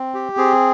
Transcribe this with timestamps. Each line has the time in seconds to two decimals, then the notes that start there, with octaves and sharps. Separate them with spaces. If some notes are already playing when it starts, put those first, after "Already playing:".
Already playing: C4
0.14 G4
0.37 C4 G#4